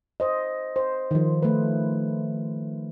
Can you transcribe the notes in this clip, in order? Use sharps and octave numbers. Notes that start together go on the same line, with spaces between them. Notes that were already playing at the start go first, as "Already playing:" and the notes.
C5 D#5
C5
D#3 F3
A3 B4